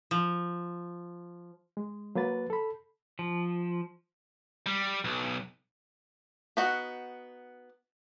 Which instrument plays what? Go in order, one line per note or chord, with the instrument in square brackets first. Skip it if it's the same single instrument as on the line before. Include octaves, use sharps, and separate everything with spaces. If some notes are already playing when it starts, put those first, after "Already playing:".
[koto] F3
[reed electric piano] G#3
F#3 A#3 B4 A6
A4 B5
[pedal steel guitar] F3
[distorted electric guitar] G3
B1
[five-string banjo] B3 D#4 F#4 F#5